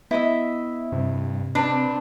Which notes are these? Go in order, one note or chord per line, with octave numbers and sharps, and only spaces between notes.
B3 E4 D#5 E5
G2 C3
C4 D4 B4